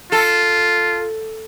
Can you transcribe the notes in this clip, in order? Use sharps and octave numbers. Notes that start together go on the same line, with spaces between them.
F4 A4